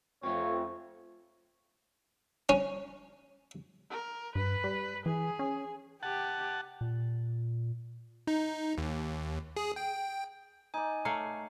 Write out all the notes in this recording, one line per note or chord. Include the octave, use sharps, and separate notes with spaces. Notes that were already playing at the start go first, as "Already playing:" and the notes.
F2 A3 C4 F4 C#5
C#4
A#4
G2 B4
G3
E3 G#4
C#4
G4 F#5 A5
A#2
D#4
D#2
G#4
G5
D#4 D5 G#5
A3 C#5 F5 A#5